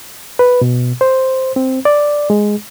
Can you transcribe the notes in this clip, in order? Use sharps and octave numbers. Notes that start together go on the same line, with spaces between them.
B4
B2
C5
C4
D5
G#3